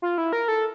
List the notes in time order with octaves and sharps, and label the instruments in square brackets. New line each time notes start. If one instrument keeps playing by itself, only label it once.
[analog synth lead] F4
E4
A#4
A4